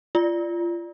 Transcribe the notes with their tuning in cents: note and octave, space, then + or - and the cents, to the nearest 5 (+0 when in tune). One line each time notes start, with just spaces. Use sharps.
F4 -25 D5 +0